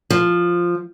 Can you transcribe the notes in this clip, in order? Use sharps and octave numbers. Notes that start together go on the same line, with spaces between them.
F3